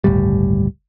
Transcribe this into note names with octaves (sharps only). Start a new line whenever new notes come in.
G1 C#2 A2 G3